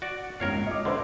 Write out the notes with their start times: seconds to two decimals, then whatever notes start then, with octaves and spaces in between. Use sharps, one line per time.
0.02 F#4 D5
0.40 A#1 G#2 A#4 C#5 F5
0.67 D#5 D6
0.85 D3 B4 C5 E5